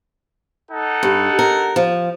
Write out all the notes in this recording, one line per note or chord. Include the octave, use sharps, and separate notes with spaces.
D#4 A4 F#5
G2
A#4
F3